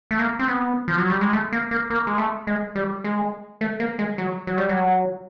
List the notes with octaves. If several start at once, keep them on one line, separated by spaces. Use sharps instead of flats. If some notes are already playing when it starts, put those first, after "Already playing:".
A3
A#3
C4
B3
F3
F#3
G3
G#3
A3
A#3
A#3
A#3
G#3
A3
G#3
G3
G#3
A3
A#3
G#3
F#3
F#3
G3
F#3